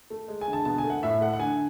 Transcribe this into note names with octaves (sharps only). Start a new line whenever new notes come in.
A3
G#3
G#5
D3
A5
B2 A5
G#5
A3
F#5
A2 E5
A3 F#5
F#5
D3 G#5